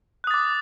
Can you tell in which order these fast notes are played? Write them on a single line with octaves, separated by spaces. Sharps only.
F#6 D#6 A6 D6